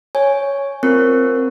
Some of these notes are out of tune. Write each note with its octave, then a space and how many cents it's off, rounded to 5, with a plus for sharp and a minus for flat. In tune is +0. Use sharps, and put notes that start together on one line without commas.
C#5 +5 G#5 +0
C4 +0 F4 +0 A#4 +0